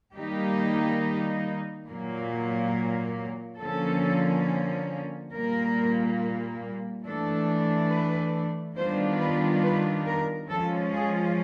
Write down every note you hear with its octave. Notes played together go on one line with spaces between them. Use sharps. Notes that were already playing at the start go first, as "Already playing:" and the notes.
D#3 G3 A#3 D#4 G4
A#2 F#3 A#3
D3 F3 A#3 C#4 A4
A#2 G3 A#3 A#4
E3 A3 D4 A4
B4
D#3 G3 B3 D4 F4 C5
B4
B4
A#4
F3 G#3 C#4 F4 A4
G#4